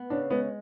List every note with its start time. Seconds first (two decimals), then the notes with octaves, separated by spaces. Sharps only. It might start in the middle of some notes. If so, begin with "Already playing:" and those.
Already playing: B3
0.10 C#3 D4
0.30 G#3 B3